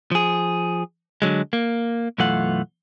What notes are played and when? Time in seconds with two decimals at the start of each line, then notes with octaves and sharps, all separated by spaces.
0.11 F3 G#4
1.22 D3 F#3 G#3
1.53 A#3
2.18 B1 F#2 E3 A3 F4 F#5